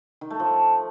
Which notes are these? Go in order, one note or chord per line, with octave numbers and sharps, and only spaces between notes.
D#3
A3
F3